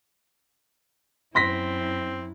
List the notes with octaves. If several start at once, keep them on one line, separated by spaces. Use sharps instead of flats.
F#2 C4 E4 C6 A#6 B6